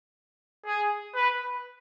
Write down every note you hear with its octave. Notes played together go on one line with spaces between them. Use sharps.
G#4
B4